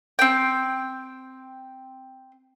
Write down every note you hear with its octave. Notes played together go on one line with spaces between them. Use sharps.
C4 G5